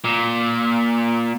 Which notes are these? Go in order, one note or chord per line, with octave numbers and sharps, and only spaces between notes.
A#2